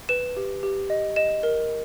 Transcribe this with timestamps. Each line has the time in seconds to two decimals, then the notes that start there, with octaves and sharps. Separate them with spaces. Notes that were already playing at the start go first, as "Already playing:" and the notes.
0.09 B4 E7
0.37 G4
0.63 G4
0.90 D#5
1.16 D#5 E7
1.43 A#4